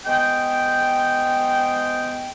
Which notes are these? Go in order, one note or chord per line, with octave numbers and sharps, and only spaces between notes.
G#3 B3 C5 G5